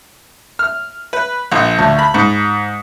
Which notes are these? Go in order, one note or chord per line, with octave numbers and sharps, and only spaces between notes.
F6
B4
A#1
D2
B5
G#2